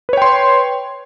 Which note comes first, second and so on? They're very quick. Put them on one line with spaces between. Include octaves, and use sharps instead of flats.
B4 C#5 G5 C6